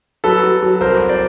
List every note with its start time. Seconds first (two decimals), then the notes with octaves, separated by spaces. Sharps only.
0.24 F#3 A4 B4
0.44 F#3
0.62 F#3
0.81 C2 A#4 C5
1.00 C2
1.09 C5 D5